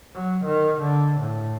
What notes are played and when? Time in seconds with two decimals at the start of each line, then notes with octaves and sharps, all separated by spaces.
0.15 F#3
0.45 D#3
0.81 D3
1.20 A2